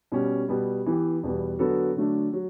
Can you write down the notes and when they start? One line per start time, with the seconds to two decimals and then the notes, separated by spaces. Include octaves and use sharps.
0.12 B2 G3 C#4
0.49 B2 G3 B3
0.86 E3 B3 E4 G4
1.23 E2 B2 G3 B3
1.59 D3 F#3 B3 F#4 A4
1.96 D3 F#3 A3 D4
2.33 F#3